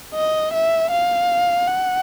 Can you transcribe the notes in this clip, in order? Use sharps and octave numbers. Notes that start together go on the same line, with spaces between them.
D#5
E5
F5
F#5